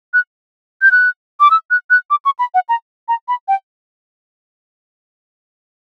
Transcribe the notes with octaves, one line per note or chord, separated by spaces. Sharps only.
F#6
G6
F#6
D6
E6
F#6
F#6
D6
C#6
B5
F#5
A#5
A#5
B5
G5